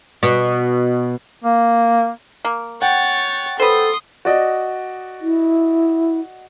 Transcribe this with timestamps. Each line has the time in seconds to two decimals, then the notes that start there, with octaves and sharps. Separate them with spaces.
0.23 B2
1.44 A#3
2.45 A#3
2.82 C#5 F#5 G5 A6
3.60 A4 B4 C5 C6 D#6
4.25 F#4 D5 D#5
5.21 E4